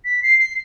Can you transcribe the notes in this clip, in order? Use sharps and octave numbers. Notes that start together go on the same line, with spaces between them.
B6
C7
C7